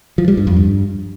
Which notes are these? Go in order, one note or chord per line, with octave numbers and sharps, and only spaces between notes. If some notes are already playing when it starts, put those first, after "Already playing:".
F3
G3
G2
F2
G2